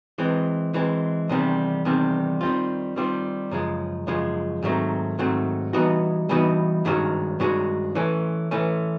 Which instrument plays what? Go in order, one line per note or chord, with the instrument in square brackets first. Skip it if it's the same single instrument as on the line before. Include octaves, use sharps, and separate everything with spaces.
[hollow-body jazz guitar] E3 G#3 C4
E3 G#3 C4
E2 C3 D#3 G3 C4
E2 C3 D#3 G3 C4
D#3 G3 C4 F4
D#3 G3 C4 F4
F#2 C#3 F3 G#3
F#2 C#3 F3 G#3
G#2 D#3 F#3 A3 C4
G#2 D#3 F#3 A3 C4
E3 G3 B3 D#4 F#4
E3 G3 B3 D#4 F#4
G2 D#3 G#3 C#4 F#4
G2 D#3 G#3 C#4 F#4
E3 A3 C#4
E3 A3 C#4